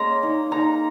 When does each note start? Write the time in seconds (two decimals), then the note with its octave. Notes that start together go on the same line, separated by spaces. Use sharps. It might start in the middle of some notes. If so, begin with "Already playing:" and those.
Already playing: G#3 A#3 C#4 A#5
0.23 D#4
0.51 D#4 A#5